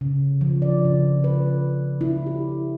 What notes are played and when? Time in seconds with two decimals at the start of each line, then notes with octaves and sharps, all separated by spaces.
0.01 C#3
0.41 F3
0.62 D5
0.85 C#3
1.24 B4
2.01 E4
2.27 G4